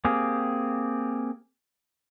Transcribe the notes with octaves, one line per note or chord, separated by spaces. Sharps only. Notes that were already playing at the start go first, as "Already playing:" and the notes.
A#3 C4 G4 G#4